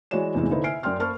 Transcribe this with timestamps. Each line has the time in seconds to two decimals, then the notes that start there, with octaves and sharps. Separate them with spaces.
0.11 E3 G#3 F#4 C#5 D5 E7
0.35 E2 A2 C3 E3 G#3 C4
0.50 D3 A#3 D#4 E4 B4 C5
0.63 E5 G#5 F6 C7 D7
0.83 F#2 D5 G5 C6 F6
1.00 A#3 C5 A5 B5 C#6 F6